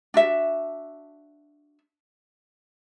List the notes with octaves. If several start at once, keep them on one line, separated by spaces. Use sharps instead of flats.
D4 F#4 E5